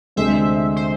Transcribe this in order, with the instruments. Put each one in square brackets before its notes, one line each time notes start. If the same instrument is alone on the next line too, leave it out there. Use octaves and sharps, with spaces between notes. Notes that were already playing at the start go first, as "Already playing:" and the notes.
[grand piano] D2 C3 G#3 D4 A4 [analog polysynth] C5 E5
[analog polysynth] C5